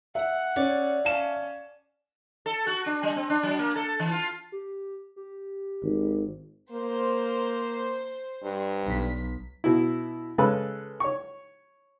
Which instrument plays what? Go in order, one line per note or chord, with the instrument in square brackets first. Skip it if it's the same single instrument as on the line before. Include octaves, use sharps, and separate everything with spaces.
[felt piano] E5 [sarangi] F#5
[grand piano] C#4 [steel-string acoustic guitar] D5
[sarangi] C#4 [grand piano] F5 A5 E7
[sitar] A4
F#4
D4
G3
C4
D4
F#3
A#3
A4
E3
F4
[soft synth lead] G4
G4
[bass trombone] G#1
[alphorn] A#3 [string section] C5
[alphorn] G2
[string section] B1 B6
[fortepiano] B2 E4
C#3 G#3 A4 B4 B5 D#6
C#5 C#6